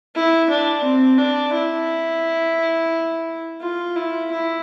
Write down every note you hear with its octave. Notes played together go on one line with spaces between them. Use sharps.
E4
D4
C4
D4
E4
F4
E4
E4